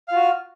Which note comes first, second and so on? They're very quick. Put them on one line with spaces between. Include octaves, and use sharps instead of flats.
F5 F4 F#4